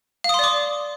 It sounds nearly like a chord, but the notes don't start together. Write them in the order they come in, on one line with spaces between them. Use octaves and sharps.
F5 D#6 C6 D5 D6